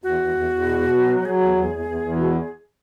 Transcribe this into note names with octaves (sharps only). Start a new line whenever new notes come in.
E2 F#4
E2
E2
E2
B2
B2
F#3
F#3
F#3 G#4
E2
E2
E2
E2
E2
B2